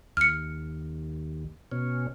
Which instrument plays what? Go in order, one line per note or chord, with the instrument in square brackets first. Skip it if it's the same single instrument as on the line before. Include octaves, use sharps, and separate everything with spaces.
[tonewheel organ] D#2 [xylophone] F6 C#7
[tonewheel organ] B2 C#4